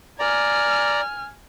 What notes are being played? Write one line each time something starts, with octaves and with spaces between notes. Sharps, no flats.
D5 G#5 A#5 F6